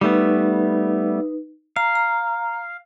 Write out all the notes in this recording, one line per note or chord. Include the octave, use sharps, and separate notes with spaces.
G3 A3 B3 D#4 B4
F5 A#5
A#5